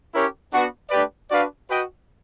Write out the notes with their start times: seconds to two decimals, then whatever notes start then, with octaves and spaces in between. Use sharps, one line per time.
0.12 C#4 E4 G4 A#4 C#5
0.51 B3 D4 F#4 B4
0.90 A3 D4 G4 B4 D5
1.29 D4 F#4 B4 D5 F5
1.67 F#4 B4 D#5 G5